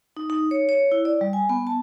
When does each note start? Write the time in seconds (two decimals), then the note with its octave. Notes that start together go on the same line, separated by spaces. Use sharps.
0.17 D#4
0.30 D#4
0.51 C#5
0.69 C#5
0.92 E4
1.05 D5
1.21 G3
1.33 G#5
1.49 B3
1.67 A5